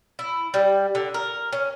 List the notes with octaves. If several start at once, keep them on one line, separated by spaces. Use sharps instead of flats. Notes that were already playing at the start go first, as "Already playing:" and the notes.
E4
G3
D3
A#4
C#4